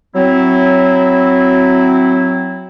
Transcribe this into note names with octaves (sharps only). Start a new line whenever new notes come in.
F#3 C4 E4